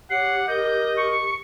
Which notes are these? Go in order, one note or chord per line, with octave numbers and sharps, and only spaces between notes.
G4 C#5 F#5 C7
A#4 D#5 G6
C#6